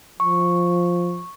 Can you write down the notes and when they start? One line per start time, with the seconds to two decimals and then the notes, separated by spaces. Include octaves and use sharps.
0.20 F3 C#6